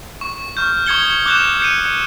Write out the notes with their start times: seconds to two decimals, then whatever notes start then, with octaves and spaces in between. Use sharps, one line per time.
0.21 C#6
0.57 C#6 F6 G6
0.86 C#6 D#6 G#6 C#7 G7
1.26 D6 F#6 G6 E7
1.60 G6 C#7 D#7